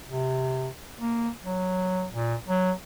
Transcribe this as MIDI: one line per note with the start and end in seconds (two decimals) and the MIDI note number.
0.08 0.68 48
0.99 1.29 58
1.44 2.05 54
2.11 2.35 46
2.48 2.72 54